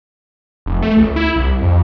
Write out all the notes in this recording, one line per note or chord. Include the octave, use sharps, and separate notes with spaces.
F1
A3
C#2
E4
C2
F2